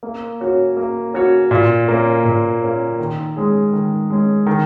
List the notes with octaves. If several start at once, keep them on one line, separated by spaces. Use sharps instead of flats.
A#3
C#4 F#4 C#5
A#3
C#4 F#4 C#5
A#2
A#3 C#4
A#2
A#3 C#4
D#3
G#3 C#4 G#4
D#3
G#3 C#4 G#4
D#3